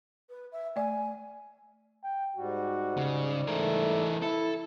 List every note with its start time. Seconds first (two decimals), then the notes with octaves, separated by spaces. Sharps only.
0.29 B4
0.52 E5
0.76 A3 D5 G#5
2.04 G5
2.37 G#2 G3 F#4
2.97 C#3
3.48 E3 A3 A#4
4.22 E4 A4